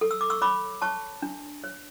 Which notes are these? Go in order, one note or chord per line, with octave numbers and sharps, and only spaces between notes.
A4
E6
D6
C#6 E6
C#5 B5 D6
C#5 A5 C#6
D4
C#5